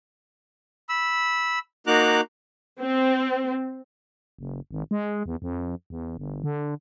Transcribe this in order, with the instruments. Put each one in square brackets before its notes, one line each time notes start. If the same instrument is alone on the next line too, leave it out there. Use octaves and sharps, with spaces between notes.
[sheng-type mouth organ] B5 E6
A#3 D#4 F#4 A#5 D6 F#6
[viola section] C4
[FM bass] F#1
G#1
G#3
E2
F2
E2
G1
D3